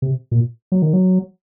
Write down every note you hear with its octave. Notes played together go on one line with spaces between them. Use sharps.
C3
A#2
F#3
D#3
F#3